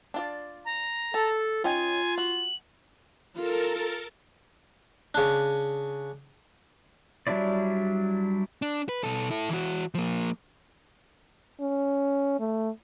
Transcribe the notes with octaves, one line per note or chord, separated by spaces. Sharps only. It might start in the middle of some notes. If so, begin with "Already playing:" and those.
D4 F4 D5
A#5
A4 A5
C#4 D#4 F4 G5 G#5
F#4 F#7
F4 A4 A#4 A5
C#3 D4
F#3 G3 D4 E4 D5
D4
B4
B2 A4
E4 A4
E3 F#4
F3 A#3
C#4
A3